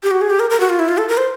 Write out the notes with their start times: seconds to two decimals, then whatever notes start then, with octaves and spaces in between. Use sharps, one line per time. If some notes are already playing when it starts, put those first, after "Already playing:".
0.03 G4
0.11 F#4
0.21 G#4
0.30 G4
0.40 A#4
0.50 A#4
0.60 F#4
0.70 F4
0.79 E4
0.89 F4
0.98 A4
1.08 A#4
1.17 C5